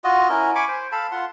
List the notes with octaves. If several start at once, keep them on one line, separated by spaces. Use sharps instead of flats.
F4 F#4 D#5
C#4 E4 A#4
G#5 B5 C#6 D6
C5
A4 F5 A5 B5
F4 F#5 C6